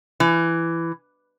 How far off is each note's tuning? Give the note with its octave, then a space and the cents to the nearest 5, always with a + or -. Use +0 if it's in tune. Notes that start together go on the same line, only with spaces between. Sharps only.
E3 +15